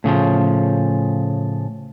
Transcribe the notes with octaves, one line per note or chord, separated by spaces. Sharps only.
A2 C#3 E3 F3